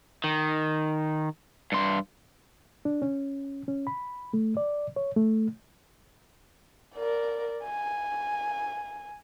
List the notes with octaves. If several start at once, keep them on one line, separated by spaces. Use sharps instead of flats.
D#3
G2 C6
D4
C#4
C#4
B5
A3
D5
C#5
A3
A#4 D5
G#5